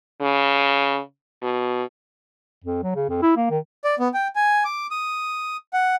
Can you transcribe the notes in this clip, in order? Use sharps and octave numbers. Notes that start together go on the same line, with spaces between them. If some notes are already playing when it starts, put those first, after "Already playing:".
C#3
B2
F2
F#3
C#3
F2
E4
A#3
D#3
D5
B3
G5
G#5
D6
D#6
F#5